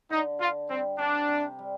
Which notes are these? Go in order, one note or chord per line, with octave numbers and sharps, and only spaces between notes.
D3 D#4
D3 F4
G3 C4
C3 D4
C3
G3